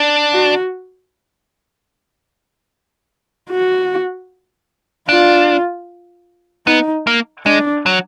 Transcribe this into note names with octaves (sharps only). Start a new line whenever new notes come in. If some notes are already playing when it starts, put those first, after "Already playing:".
Already playing: D4
F#4
F#4
D4 F4
B3 D#4
A#3
G#3 D4
F#3